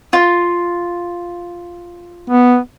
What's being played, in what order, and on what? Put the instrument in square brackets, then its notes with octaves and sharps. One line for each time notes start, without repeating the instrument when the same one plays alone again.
[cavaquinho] F4
[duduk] B3